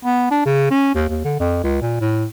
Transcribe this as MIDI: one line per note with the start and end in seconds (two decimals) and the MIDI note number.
0.05 0.28 59
0.31 0.44 62
0.46 0.70 49
0.71 0.95 61
0.95 1.08 39
1.09 1.22 39
1.25 1.35 50
1.39 1.61 41
1.63 1.78 37
1.82 1.96 46
2.01 2.25 45